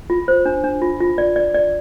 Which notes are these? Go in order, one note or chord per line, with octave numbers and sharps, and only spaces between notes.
F4
C5
D4
D4
F4
F4
D5
D5
D5